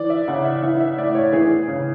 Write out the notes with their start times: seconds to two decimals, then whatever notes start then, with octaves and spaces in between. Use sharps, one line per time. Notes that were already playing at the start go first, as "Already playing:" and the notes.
Already playing: E3 D5
0.10 E5
0.28 C#3 F#5
0.45 E5
0.62 E3 F#5
0.80 E5
0.98 A2 D5
1.15 C#5
1.33 E3 G#4
1.68 C#3